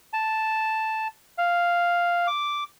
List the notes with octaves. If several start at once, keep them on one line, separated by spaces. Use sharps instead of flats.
A5
F5
D6